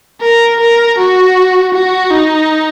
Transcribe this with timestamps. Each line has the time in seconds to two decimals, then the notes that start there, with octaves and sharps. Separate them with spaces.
0.21 A#4
0.60 A#4
0.98 F#4
1.74 F#4
2.11 D#4